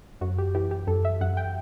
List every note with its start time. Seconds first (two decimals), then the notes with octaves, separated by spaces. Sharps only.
0.21 F#2 F#4
0.38 G4
0.55 E3 G4
0.71 G4
0.87 F#2 A4
1.05 E5
1.21 F#2 F#5
1.37 G5